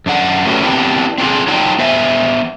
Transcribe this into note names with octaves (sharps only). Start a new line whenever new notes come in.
F#2 D4 F#5
A3 C#4 F#4 G4 A4 B4
B3 C4 D4 E4 G4
C4 D4 F4 G#4
F#3 D#4 F4 F#5 G5 A5
B3 C5 E5 F5 G#5